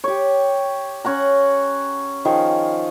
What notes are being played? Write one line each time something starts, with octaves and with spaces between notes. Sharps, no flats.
G4 C#5
C#4 C#5 F#5 A#5
D#3 F3 G#4